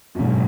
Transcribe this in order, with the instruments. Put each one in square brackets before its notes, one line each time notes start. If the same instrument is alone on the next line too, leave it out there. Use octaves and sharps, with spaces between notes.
[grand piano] F#2
[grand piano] G#2 [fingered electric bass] B2 F#3 A#3 C#4